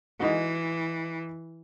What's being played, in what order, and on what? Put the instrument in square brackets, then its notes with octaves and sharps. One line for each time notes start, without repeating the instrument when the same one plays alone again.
[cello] E3 [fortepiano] G#3 D#4 F#4